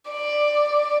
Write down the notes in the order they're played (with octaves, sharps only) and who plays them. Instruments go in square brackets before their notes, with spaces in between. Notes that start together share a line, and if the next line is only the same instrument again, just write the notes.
[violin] D5